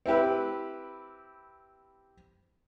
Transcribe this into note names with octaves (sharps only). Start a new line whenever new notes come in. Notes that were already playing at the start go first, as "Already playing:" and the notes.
C4 E4 G4 B4